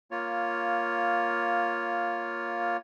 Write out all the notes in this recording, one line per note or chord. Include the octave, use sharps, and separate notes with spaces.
A#3 F4 C#5